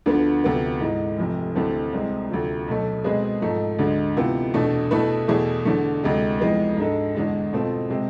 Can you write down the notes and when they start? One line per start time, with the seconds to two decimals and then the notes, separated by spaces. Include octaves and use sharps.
0.06 D2 D3 F3 B3 D4
0.44 D2 C3 F3 B3
0.80 G#2 E3 G#3
1.18 F1 F2 C3
1.55 D2 C3 E3 A3 C4
1.93 C2 C3 G#3 C4 G#4
2.30 D2 C3 F3
2.68 B1 B2 A3
3.04 B2 G#3 C4 G#4 B4
3.42 G#2 F3 A3
3.79 D2 D3 G#3
4.17 C3 E3 B3 F4
4.54 E2 B2 A3 D4
4.91 B2 A3 E4 B4
5.28 E2 B2 A3 E4 G#4
5.65 E2 D3 A3
6.03 D2 C3 G#3
6.40 F2 E3 G#3 B3
6.77 G#2 G#3 D4 A4
7.15 E2 D3 G#3 D4
7.53 B2 A3 C4 F4
7.90 C3 G#3 C4